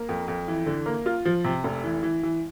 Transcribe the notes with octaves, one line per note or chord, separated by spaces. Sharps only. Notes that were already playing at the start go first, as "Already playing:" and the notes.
Already playing: A#3
F2
F2
E3
D3
A#3
F4
F3
C3
F1
E3
E3
E3